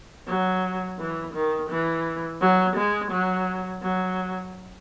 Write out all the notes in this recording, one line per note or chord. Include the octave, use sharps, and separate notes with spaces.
F#3
E3
D#3
E3
F#3
G#3
F#3
F#3